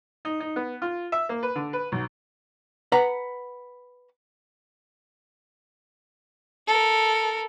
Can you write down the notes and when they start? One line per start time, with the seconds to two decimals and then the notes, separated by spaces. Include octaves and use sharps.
0.25 D#4
0.40 D#4
0.56 B3
0.82 F4
1.12 E5
1.29 A#3
1.43 B4
1.56 D3
1.73 B4
1.92 B1
2.92 B4 F#5 A#5
6.67 A4 A#4